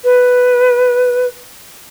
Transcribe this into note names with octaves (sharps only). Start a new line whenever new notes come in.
B4